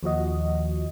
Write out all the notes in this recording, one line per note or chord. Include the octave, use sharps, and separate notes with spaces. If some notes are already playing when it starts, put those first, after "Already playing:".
D#2 F3 F#4 D#5